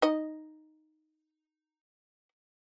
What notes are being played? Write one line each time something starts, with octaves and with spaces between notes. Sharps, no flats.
D#4 D#5